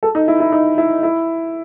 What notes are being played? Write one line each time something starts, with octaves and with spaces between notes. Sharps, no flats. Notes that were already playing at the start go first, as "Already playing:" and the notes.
A4
D#4
E4
E4
D#4
E4
E4